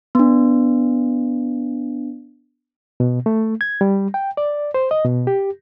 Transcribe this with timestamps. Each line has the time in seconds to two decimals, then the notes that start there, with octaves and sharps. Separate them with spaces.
0.15 B3 D4
3.00 B2
3.26 A3
3.61 G#6
3.81 G3
4.14 G5
4.37 D5
4.74 C5
4.91 D#5
5.05 B2
5.27 G4